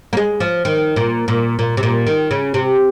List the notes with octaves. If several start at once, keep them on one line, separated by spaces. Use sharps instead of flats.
A#3
G#3
F3
D#3
A#2
A#2
A#2
C3
A#2
D#3
C#3
C3